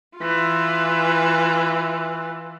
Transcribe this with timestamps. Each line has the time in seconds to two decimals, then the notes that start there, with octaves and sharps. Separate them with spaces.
0.18 E3 F4